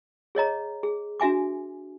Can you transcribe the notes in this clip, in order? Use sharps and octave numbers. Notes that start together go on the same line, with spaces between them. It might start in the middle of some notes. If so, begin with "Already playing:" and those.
G#4 C#5 D#5 A#5
G#4
D4 F#4 E5 G#5 D6